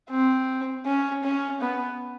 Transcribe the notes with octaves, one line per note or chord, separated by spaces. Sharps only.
C4
C#4
C#4
B3